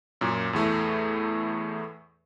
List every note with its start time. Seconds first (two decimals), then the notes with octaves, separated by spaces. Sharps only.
0.21 F#2 A#2
0.53 E2 A2 A3